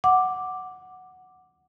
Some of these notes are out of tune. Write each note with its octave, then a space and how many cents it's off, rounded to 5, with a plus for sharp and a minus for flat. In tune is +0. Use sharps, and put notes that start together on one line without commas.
F#5 +0 D6 +0